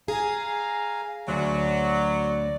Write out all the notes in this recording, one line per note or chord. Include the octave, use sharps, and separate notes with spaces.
G#4 F5 G#5 A#5
D2 F#3 D5